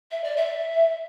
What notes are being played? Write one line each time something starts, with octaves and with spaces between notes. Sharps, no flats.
E5
D5
E5